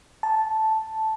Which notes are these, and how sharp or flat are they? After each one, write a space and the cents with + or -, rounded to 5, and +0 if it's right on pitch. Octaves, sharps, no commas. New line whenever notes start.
A5 -5